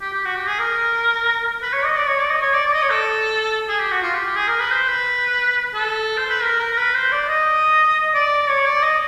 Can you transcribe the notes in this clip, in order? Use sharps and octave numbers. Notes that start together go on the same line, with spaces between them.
G4
G4
F#4
G4
G#4
A#4
B4
C#5
D#5
D5
C#5
D5
D#5
C#5
D5
D5
D#5
C#5
A4
G#4
G4
F#4
F4
G4
G4
G#4
A#4
B4
C5
B4
A4
C5
B4
A#4
A#4
A#4
B4
C5
D5
D#5
D5
C#5
D5
D#5